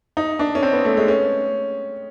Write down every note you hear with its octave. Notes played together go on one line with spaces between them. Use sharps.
D#4
D4
C#4
C4
B3
A3
G#3
C#4